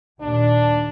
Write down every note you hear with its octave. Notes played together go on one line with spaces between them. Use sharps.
D#2 A#2 D4